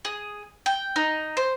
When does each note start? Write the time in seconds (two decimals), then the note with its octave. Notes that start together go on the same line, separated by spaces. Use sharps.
0.05 G#4
0.66 G5
0.96 D#4
1.37 C5